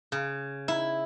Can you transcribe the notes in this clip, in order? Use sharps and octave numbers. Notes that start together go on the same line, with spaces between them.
C#3
E4